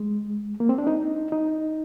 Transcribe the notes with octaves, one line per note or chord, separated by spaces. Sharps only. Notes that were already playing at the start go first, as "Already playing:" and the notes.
Already playing: G#3
A#3
C4
D4
D#4
D#4